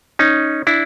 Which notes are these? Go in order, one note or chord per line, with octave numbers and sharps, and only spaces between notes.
C#4 D#4
D4 E4